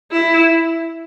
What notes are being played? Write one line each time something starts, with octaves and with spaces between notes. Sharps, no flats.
E4